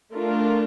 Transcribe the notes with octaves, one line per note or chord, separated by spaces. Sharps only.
A3 D4 F4 A#4